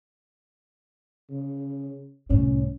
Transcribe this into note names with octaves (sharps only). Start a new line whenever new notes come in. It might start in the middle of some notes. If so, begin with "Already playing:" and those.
C#3
C2 A2 C#4